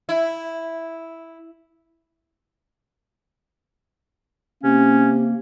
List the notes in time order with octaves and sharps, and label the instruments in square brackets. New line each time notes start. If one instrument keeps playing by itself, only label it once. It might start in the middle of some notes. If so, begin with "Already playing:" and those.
[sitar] E4
[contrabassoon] C3 [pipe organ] A#3 [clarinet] C#4